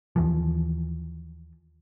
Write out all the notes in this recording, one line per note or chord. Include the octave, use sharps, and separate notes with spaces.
D#2 E3 F3